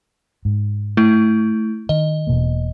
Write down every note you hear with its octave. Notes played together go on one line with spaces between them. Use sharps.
G#2
A3 E4
D#3 D#5
E1 B2 A#3